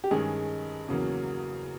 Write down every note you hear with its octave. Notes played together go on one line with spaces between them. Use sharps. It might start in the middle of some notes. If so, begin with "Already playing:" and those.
G4
G2 D#3 G#3 C#4 G#4
E2 C#3 F#3 A#3